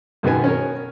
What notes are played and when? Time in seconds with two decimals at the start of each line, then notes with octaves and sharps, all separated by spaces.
0.23 F#2 B2 D#3 B3 G#5
0.44 C#4 A#4